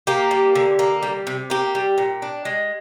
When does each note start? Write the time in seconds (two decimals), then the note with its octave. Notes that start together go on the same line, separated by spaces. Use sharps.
0.07 A#3 G4
0.31 G3
0.55 D3
0.79 A#3
1.03 G3
1.27 C3
1.50 A#3 G4
1.75 G3
1.98 A#2
2.22 D4
2.45 G#3